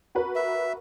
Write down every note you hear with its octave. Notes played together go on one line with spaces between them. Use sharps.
F#4 A#4 B4
E5